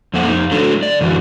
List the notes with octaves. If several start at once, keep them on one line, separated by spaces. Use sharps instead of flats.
F2 A3 A#3 F#5
F2 D#4
F#3 A3 D4 A4
D3 D5
F#2 D3 E3 F#3